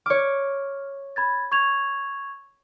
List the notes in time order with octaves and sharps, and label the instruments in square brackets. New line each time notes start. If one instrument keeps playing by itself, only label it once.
[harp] C#5 D6 [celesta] F6
[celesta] B5 G#6 A6
C#6 G#6 F7